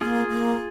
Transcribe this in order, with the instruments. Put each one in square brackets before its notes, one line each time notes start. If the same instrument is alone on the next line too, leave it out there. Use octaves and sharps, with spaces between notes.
[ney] A#3 [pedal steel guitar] F4 G#4
[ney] A#3